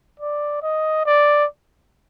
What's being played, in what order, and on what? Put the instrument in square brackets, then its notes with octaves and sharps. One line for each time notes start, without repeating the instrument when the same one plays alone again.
[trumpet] D5
D#5
D5